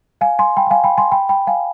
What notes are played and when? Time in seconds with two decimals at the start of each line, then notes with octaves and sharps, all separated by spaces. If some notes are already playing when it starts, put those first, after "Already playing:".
0.21 F5 G#5
0.39 G#5 C6
0.57 G5 B5
0.67 G5
0.71 F5 G#5
0.84 G5 B5
0.98 G#5 C6
1.12 G5 B5
1.29 G5 B5
1.47 F5 G#5